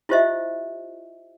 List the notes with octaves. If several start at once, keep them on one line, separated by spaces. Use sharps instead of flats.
E4 F4 G4 C5 D#5 E5